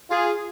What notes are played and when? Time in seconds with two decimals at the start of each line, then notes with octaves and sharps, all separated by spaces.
0.10 F4 G#4